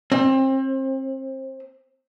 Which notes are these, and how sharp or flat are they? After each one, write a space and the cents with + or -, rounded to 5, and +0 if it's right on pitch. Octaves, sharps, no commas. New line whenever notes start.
C4 +30